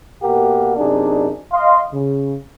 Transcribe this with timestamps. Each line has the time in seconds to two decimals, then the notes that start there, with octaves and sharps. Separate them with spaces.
0.22 B2 A#3 G4 A#4 F#5
0.77 F#2 C3 D4 D#4 G#4 D5
1.52 D#5 F5 C6
1.93 C#3